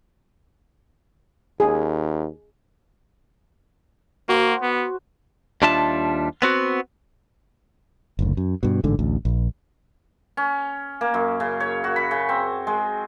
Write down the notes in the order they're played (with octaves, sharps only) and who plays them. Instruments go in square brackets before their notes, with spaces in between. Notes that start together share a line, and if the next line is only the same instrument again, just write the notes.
[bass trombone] D#2 [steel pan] G#4
[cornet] A#3 [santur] F#4 C5
[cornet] B3
[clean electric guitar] D#2 G3 D4 F4 E5 A5
B3 C4 F#4
[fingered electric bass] F#1 D2
F#2
G2 B2
A1 G#2 D3
A1 D2
A#1
[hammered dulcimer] C#4
A#3
F#2
C#3
C#5
F#4
B5
C#3
C4
G#3